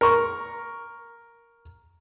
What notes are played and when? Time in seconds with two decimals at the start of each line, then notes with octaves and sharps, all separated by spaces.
0.01 A#4 C#6